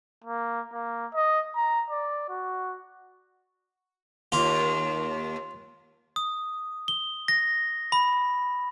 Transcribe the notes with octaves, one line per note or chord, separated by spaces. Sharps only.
A#3
A#3
D#5
A#5
D5
F#4
D#2 F4
D#6
G7
A#6
B5